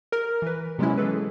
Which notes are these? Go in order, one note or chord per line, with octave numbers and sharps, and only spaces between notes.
A#4
E3 B4
C3 F#3 G#3 B3 C#4 E4
E3 G#3 G#4 A4 B4